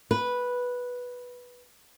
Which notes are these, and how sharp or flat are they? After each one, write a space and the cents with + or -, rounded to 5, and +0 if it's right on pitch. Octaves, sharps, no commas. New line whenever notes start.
B4 -5